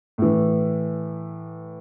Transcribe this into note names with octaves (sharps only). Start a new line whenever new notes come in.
A2 E3